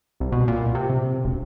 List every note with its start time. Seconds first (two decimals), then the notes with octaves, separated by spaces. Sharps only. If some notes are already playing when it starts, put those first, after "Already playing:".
0.20 C2
0.32 B2
0.48 A#2
0.75 C3
0.90 C3
1.25 E1